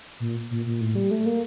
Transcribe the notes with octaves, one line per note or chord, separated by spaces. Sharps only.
A#2
A#2
A#2
A2
G3
A3
A#3